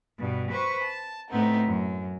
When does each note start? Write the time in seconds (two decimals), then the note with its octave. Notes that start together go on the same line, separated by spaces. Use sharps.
0.19 G2 B2
0.52 B4 C5 C#6
0.82 A5
1.30 A2 A3 B3 C4 D#4
1.67 F#2